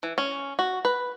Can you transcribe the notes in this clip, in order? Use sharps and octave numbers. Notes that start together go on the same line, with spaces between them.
E3
C#4
F#4
B4